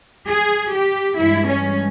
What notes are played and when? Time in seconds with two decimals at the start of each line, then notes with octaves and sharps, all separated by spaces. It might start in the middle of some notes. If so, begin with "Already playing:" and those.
0.27 G#4
0.72 G4
1.17 G2 E3 G#3 E4
1.47 C#4